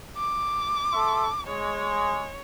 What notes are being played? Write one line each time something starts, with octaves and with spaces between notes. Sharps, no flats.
D6
A4 E5 C6
G#3 C#5